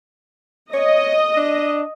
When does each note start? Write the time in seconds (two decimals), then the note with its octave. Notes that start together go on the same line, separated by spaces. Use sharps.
0.74 C#5 D#5
1.37 D4